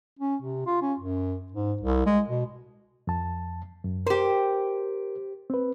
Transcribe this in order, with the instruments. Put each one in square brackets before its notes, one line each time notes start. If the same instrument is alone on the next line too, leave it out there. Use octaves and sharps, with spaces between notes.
[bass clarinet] C#4
C3
F4
C#4
F#2
G#2
C2
G#3
B2
[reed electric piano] F2 A5
F#2
[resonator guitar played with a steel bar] G4 C5 [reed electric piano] A#4
[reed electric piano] C4 B4